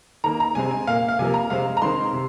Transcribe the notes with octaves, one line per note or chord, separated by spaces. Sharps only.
D#3 A#3 A#5
A#5
C3 G#3 C4 G#5
G#5
A#2 A#3 F5
F5
C3 F3 A#3 G#5
A#5
C3 G#3 C4 F5
A#5
D#3 G#3 C4 C6
C3